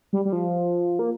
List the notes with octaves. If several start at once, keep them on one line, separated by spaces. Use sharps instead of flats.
G3
G3
F3
A#3